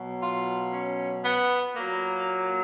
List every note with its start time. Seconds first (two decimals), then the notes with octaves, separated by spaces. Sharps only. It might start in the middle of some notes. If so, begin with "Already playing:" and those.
Already playing: B2 F#3
0.21 F4
0.73 C#4
1.25 B3
1.76 A#2 F#3 A#3